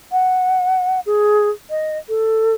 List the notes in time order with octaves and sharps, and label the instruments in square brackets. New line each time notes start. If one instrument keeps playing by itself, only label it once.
[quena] F#5
G#4
D#5
A4